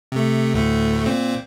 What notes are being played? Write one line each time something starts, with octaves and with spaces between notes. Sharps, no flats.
C3 A3
D2 A2 A3
A#2 C4